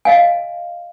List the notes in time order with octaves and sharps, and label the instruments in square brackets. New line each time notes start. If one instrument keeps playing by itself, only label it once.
[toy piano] D#5 F5 G#5